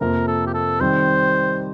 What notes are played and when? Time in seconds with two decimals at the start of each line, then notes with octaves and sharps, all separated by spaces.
0.01 F2 C3 F3 A#3 A#4
0.27 A4
0.47 G4
0.54 A4
0.81 D#3 G3 C4 D#4 C5